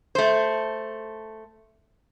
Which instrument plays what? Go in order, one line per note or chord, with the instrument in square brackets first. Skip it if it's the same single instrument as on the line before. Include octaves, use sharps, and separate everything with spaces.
[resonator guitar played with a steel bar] A3 C5